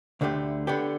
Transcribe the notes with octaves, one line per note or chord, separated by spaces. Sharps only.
D2 D3 A3 G4
D3 B3 G4